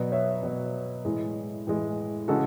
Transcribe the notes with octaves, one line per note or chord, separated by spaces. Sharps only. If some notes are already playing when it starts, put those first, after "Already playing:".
Already playing: B2 F#3 B4 D5
C#5 E5
B2 F#3
A2 E3 G#3
A2 E3 G#3
C#3 E3 G#3 F#4 A4